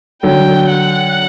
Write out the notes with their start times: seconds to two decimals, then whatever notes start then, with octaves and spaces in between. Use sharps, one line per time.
0.23 D3 F#3 G5
0.70 F#5